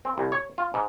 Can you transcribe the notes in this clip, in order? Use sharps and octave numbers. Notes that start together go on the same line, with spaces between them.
C4
C2
C#5
F4
G#2